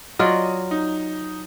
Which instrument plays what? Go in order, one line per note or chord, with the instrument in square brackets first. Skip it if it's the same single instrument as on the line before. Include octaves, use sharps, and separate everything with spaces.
[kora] F#3 F4 D5 [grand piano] D#5
[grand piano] D#4